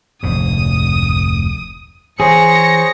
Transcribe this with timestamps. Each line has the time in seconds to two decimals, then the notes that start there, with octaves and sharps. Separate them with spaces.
0.23 F1 D2 G#2 D#6
2.20 E3 G#4 C5 C#5 A#6 C#7